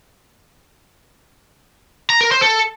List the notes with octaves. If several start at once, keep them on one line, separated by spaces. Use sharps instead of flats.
A#5
A#4
C5
A4